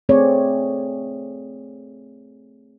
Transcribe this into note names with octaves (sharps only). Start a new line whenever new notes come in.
A3 C4 G#4 C#5 D5